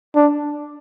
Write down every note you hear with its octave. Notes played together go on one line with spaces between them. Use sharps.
D4